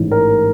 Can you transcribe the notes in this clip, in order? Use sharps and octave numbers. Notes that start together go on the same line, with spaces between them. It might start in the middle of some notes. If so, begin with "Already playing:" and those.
Already playing: A1 G#2 E3
A#4